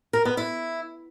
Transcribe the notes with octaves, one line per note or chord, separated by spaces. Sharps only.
A#4
B3
E4